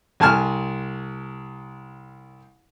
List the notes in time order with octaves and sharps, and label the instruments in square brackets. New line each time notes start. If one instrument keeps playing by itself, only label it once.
[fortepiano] C2 G#5 A5 F6